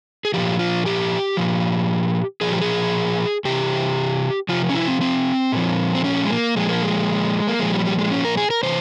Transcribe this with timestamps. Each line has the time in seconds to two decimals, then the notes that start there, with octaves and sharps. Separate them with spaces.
0.25 G#4
0.34 A#2 F3 G4
0.59 F4
0.86 G4
1.37 A#2 F3
2.41 A#2 F3 G#4
2.51 G4
2.61 G#4
3.45 C3 E3 G4
4.49 C3 F3 F4
4.70 C#4
4.75 E4
4.87 C4
5.01 C4
5.52 A#2 F3
5.95 C4
6.04 C#4
6.25 G#3
6.30 A#3
6.56 A#2 F3 G#3
6.69 A#3
6.82 G#3
7.47 A#3
7.60 A#2 F3 G#3
7.73 G3
7.85 G3
7.99 G#3
8.12 C#4
8.25 A#4
8.37 G#4
8.50 A#4
8.63 C3 E3 C5